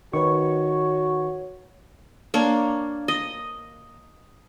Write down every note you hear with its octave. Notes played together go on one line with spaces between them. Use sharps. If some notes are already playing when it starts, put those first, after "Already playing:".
D#3 F#4 B4 C#5 C#6
A#3 D4 C#5
D#5